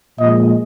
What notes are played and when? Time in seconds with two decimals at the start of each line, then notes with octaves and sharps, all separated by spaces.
0.19 A#2 F3 G#3 D#5